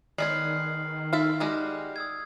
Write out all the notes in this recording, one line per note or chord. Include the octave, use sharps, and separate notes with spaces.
D#3 G#3 B3 C#5 D5 F6 C7 F#7
D#4 A4 E5 F5
G3 G#3 F#4
D#6 E6 G#6